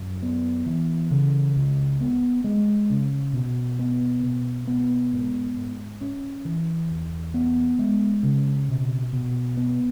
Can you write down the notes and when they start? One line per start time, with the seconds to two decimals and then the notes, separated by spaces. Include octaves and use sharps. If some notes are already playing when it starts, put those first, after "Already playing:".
Already playing: F#2
0.23 B3
0.66 E3
1.11 C#3
1.56 C#2
2.01 B3
2.44 G#3
2.90 C#3
3.33 B2
3.79 B3
4.23 B2
4.67 B3
5.13 G#2
5.57 G#2
6.01 C#4
6.45 E3
6.91 E2
7.34 B3
7.79 G#3
8.23 C#3
8.69 B2
9.13 B2
9.57 B3